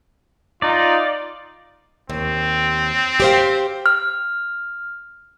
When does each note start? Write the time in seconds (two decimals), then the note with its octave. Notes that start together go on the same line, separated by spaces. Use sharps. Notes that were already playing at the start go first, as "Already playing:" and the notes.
0.62 D#4 F4 D5
2.10 D#2 C4
3.20 G4 C5 F5
3.86 F6